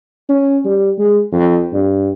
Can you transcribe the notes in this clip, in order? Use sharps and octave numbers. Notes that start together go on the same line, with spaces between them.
C#4
G3
G#3
F2
G2